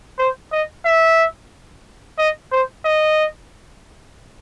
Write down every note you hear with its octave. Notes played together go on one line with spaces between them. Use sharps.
C5
D#5
E5
D#5
C5
D#5